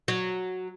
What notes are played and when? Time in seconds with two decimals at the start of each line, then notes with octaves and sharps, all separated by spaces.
0.08 F#3